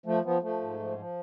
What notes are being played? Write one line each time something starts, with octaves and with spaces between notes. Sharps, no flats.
F3 A3
F3 B3
F3 A3
G#2
F3
F3